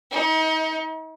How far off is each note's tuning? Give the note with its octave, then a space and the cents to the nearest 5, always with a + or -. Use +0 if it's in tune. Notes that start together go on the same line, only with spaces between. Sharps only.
D#4 +35